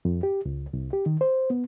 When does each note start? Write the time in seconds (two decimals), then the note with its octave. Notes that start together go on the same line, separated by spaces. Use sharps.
0.05 F2
0.23 G4
0.46 C#2
0.73 C2
0.93 G4
1.06 D#3
1.21 C5
1.50 B3